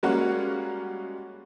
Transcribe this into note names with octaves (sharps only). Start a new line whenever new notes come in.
G3 G#3 A#3 C#4 F#4 F#5